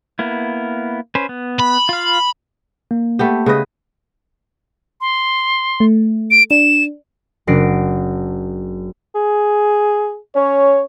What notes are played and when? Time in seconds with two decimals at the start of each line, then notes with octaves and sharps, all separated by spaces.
0.19 A#3 B3 E4
1.15 C#4 B4 C5
1.29 B3
1.60 B5
1.89 F4 F5
2.91 A#3
3.19 A3 B3 G4
3.46 C#3 B4 D#5
5.01 C6
5.80 A3
6.31 D7
6.51 D4 E7
7.47 F#1 F#3 D4 A#6 C7 D7
9.15 G#4
10.35 C#4 C#5